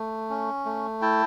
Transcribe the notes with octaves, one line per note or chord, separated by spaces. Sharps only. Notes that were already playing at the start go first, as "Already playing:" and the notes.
Already playing: A3
C#4
A3
E4 G5 A5